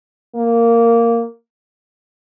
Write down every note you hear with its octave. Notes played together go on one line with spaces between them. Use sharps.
A#3